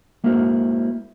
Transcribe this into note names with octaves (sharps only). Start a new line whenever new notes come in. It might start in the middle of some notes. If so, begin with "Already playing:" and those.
G#3 A#3 E4 F#4 A#4 C5